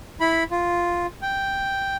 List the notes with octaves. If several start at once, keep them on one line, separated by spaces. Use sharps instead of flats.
E4 B5
F4
G5